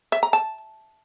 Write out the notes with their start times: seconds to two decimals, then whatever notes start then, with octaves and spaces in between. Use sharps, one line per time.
0.12 E5
0.23 A#5
0.33 A5